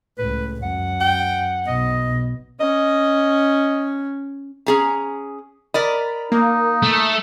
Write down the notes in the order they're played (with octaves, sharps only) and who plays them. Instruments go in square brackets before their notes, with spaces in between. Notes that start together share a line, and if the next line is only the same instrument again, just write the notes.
[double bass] C#2 A2 [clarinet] B4
[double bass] F#2 [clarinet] F#5
[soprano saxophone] G5
[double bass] B1 B2 [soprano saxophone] D#5
[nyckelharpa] C#4 [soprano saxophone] D#5
[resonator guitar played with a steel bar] C#4 G#4 A#5
[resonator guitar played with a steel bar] A#4 D5 D#5 [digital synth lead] B5
[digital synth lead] A#3 [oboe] D#4
[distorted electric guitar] A3